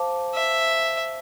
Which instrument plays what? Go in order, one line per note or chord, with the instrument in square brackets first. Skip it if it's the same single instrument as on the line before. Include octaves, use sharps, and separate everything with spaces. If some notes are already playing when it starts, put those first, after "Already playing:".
Already playing: [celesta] C5 F5 A5 D6
[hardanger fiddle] E5